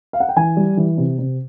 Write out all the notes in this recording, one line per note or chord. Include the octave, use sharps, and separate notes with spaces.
F5
F#5
G5
E3 G#5
G3
E3
C3
C3